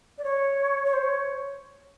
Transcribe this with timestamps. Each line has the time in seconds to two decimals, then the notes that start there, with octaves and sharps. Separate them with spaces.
0.18 D5
0.24 C#5
0.85 C#5
0.93 C5
1.03 C#5